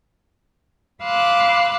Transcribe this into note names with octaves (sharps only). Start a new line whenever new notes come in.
F5 B5 C6 D6 E6 F#6